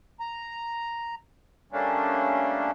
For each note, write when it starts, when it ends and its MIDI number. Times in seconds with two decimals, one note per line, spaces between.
0.20 1.15 82
1.72 2.71 55
1.72 2.71 57
1.72 2.71 58
1.72 2.71 61
1.72 2.71 62